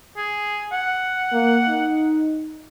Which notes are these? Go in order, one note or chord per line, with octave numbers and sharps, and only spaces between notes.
G#4
F#5
A#3
D#4